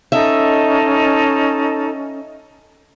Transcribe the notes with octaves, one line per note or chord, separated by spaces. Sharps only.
C#4 D#4 A4 D#5 E5 A5